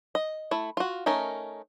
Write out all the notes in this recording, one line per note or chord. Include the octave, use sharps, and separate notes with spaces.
D#5
A3 E4
F4 F#4
A3 C#4 D#4 A#4